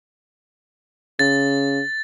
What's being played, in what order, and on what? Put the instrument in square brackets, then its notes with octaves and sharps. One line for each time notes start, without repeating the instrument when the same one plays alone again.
[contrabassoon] C#3 [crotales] A6